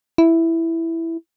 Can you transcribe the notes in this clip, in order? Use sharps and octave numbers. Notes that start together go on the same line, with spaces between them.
E4